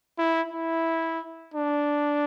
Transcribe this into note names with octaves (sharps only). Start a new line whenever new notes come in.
E4
E4
D4